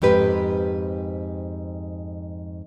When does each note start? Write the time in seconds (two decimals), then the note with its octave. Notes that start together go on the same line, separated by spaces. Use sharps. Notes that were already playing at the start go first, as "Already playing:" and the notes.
0.02 F2 G#2 G4 B4